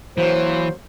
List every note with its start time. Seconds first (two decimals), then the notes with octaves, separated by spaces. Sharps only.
0.18 E3 F#3 A#3 C5